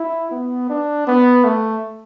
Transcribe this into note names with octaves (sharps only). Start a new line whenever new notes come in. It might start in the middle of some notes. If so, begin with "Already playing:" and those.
Already playing: E4
B3
D4
B3
A3